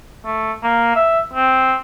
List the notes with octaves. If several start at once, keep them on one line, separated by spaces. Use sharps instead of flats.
A3
A#3
E5
C4